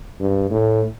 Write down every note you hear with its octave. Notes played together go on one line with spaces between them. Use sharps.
G2
A2